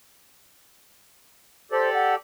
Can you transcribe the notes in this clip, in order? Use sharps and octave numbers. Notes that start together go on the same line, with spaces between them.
G4 A4 C5 D5
F#5